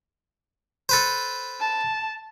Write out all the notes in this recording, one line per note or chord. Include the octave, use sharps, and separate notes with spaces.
A4 B4 C5
A5